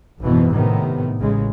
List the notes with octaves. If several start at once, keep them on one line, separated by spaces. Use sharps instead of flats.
G#1 F#2 B2 E3 F3
A2 C3 D#3 B3
A1 C#3 G#3